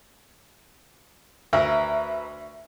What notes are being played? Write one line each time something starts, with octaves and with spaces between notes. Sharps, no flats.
D2 A#4 B4 E5